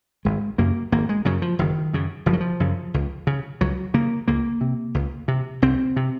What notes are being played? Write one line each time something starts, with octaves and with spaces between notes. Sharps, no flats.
G#1 G#3
F#2 C#3 A#3
G#1 A#3
G#3
F#2 C#3 F#3
F3
F#1 D#3
F#2 C#3
F#1 F3
F#3
F3
F#2 C#3
C#2
C#3
C#2 F#3
C#3 A#3
C#2 A#3
C3
C#2
C3
C2 C4
C3